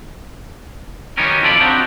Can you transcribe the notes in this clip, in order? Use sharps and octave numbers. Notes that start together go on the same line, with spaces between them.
D#3 F#3 G3 B3 C#4 A#4
F2 F4 A4 D5 B5
C4 D4 D#4 F4 F#4 C5